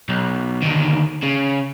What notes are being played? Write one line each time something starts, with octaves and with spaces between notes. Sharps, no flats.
B1
D2 D#3
C#3